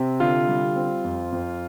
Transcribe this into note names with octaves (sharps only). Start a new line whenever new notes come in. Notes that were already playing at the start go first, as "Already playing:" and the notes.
Already playing: C3 C4
D3 F4
G3
C4
F2
F2